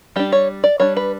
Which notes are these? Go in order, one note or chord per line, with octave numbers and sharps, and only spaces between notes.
G3 D4 G4
C#5
D5
G3 D4 C#5
B4